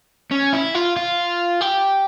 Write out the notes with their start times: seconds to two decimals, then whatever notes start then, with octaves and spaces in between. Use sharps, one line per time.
0.31 C#4
0.53 E4
0.75 F4
0.96 F4
1.61 G4